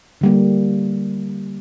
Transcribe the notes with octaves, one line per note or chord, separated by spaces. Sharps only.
D3 G3 A#3